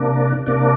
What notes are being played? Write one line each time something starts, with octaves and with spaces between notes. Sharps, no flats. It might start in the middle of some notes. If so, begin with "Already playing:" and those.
Already playing: C3 A#3 D4
C3 A#3 D4